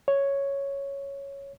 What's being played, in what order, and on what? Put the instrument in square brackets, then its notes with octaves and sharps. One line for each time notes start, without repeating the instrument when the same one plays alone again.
[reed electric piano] C#5